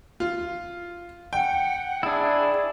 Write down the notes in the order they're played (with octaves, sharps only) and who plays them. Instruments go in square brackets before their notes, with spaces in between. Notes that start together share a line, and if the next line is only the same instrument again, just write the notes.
[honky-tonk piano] F4
[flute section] F#5 [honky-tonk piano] G5
[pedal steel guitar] D4 E4 [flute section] G#4